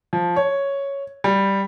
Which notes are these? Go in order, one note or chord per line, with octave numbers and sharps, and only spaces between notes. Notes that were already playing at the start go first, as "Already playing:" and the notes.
F3
C#5
G3